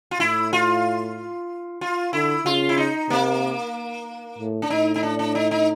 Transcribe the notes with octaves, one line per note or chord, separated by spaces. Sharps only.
F4
A2 E4
F4
F4
D3 E4
C#3 F4
E4
D#4
C3 A#3
A2
D4
A2 D#4
D#4
D4
D4
D#4
D#4